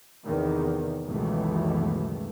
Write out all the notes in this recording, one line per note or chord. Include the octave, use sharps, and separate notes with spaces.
E2 C3 D#3
F#1 C#2 B2 D#3 E3 A3